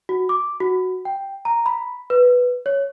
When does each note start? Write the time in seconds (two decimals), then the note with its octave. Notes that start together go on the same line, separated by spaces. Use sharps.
0.09 F#4
0.29 D6
0.60 F#4
1.05 G5
1.45 A#5
1.66 B5
2.10 B4
2.66 C#5